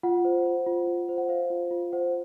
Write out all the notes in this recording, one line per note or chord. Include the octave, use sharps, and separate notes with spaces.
F4 F#5
C5
C5
F4
F4
C5
F#5
C5 F5
F4
F4
C5 F#5